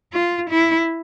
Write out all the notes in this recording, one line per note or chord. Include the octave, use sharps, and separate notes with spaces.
F4
E4